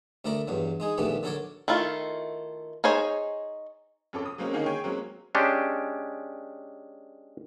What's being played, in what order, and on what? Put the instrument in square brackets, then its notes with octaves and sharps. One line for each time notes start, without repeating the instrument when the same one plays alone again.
[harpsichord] D2 A3 A#4 D5 A#5 B5
E2 G2 F#3
G#3 D#4 G#4
A#1 D#2 A3 B3 D4 G4
D3 F#3 A4 A#4 C#5 D5
[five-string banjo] D#3 A3 E4 F4
D#4 G#4 C5 C#5 G#5
[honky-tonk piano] F2 C#4 A4 D6
D#6
F#3 G#3 A#3 C4 C#4
D3 D#3 A#3 C#4 D#4 G#4
G#4 C#5 G5 G#5
F#3 G#3 A#3 C4 C#4
[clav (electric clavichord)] G#3 C#4 D4 G4